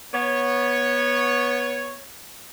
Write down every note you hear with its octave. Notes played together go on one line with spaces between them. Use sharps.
B3 C#5